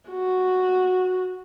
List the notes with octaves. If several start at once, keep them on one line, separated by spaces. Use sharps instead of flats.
F#4